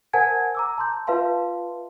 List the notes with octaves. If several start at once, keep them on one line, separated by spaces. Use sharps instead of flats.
A#4 C5 F#5 G#5 A5 G#6
A#5 D6 E6
A5 C6 G6
F4 B4 E5 F5 A5 C6